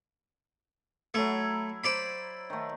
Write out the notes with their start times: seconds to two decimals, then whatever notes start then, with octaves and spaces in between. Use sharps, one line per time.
1.14 F#3 A3 E4
1.84 C5 D5 B5
2.50 D#3 A3